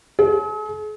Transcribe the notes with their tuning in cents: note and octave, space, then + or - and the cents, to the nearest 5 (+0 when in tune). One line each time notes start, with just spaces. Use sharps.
G#4 +45